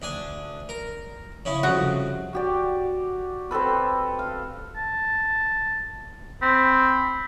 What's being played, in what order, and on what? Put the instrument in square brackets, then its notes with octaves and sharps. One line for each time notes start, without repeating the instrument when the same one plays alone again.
[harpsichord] D2 D4 G#5
A#4
C#3 C#4 E4
[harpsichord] C2 F2 C#3 [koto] F#4
[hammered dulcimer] F#4 G4 D5
C4 G4 A4 B4
F5
[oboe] A5
[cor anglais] C4 [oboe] B5